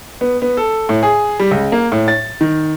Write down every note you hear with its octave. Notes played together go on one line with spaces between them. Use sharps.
B3
B3
A4
A2
G#4
G3
C#2
A#3
A2
A6
D#3